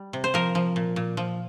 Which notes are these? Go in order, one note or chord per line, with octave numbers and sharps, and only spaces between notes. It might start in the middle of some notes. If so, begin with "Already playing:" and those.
Already playing: G3
C3
C5
F3 A#4
F3
A#2
A#2
F3